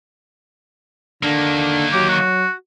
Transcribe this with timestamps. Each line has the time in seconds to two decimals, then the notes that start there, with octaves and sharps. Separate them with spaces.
1.23 D3 D#3 A#3
1.93 F#3 G4
2.09 F#4